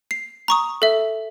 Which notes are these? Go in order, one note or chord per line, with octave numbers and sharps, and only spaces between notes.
C7
A#5 C#6 D#6
A4 E5